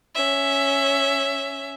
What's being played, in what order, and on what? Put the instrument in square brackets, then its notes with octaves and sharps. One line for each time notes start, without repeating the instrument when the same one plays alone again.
[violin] C#4 E5